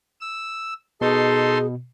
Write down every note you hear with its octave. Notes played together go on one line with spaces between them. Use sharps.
E6
B2 D#4 G#4 A4 C6